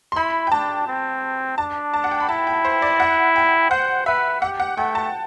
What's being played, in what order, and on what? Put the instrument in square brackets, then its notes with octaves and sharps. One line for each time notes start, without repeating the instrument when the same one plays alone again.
[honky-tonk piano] C6
[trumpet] E4 [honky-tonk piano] B5
[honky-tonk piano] G5
[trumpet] D4 [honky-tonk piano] A5
[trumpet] C4
[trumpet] D4 [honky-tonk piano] A5
[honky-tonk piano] A5
F#5
G5
B5
[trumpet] E4 [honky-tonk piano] A5
[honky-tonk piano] G5
C5
D5
F#5
G5
[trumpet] C5 [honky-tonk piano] F#5
[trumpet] B4 [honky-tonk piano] E5
[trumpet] G4 [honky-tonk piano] F#5
[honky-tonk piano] F#5
[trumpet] A3 [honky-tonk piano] G5
[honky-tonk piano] A5